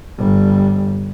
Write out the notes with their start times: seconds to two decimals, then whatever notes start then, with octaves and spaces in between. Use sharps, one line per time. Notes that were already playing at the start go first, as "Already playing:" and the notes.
0.19 G1 G3